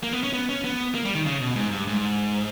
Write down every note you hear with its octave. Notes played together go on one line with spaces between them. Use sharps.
A#3
B3
C#4
B3
C#4
B3
A#3
G3
D#3
C#3
B2
G#2
G2
G#2